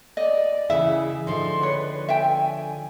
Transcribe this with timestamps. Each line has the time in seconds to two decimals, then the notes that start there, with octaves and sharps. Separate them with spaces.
0.17 D5 D#5
0.70 C#3 E3 E4 G#4 E5
1.27 D3 F3 D#4 C6
1.63 B4 C#5
2.09 E5 G5 G#5